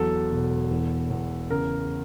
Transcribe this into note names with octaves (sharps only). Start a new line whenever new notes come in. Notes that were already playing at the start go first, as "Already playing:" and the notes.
Already playing: E2 F#3 A4
E1
E2
E2
C#3 A#4